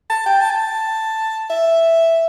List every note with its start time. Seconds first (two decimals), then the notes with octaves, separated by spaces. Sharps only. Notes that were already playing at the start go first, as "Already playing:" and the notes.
0.10 A5
0.26 G5
0.41 A5
0.51 G5
0.56 A5
1.50 E5